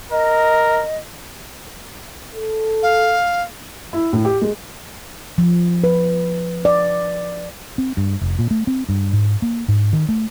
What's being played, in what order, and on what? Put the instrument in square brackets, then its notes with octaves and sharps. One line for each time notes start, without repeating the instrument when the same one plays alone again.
[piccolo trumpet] A#4 [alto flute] D#5
[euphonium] A4
[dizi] F5
[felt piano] E4
A2
G4
G#3
[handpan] F3
B4
D5
[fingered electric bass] C4
G2
F1
A#2
A3
C4
G2
G#2
A#3
G#2
D#3
A3